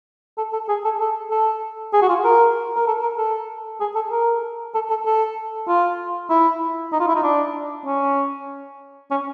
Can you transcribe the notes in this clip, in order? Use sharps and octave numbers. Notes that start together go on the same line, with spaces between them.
A4
A4
G#4
A4
A4
A4
G#4
F#4
F4
A#4
A#4
A4
A#4
A4
G#4
A4
A#4
A4
A4
A4
F4
E4
D#4
F4
E4
D#4
D4
C#4
C#4